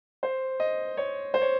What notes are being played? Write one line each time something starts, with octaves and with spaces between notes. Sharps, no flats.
C5
D#5
C#5
C5
C#5